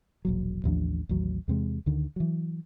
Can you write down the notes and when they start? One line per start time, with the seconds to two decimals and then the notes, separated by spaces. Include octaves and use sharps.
0.25 E1 A#1 F#3
0.64 A1 D#2 F3 D4
1.09 A1 D#2 F#3
1.48 E2 C3 G#3
1.86 D2 D3 D#3
2.16 E3 F#3